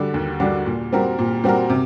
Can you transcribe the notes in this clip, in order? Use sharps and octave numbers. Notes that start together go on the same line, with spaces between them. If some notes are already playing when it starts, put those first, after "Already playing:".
Already playing: D3 G3 D4 F#4
D#2
D3 G3 D4 F#4
A#2
G3 C4 F#4 A#4
A#2
G3 C4 F#4 A#4
C3